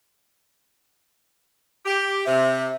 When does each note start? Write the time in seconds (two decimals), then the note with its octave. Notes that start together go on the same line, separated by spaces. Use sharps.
1.86 G4
2.26 C3 E5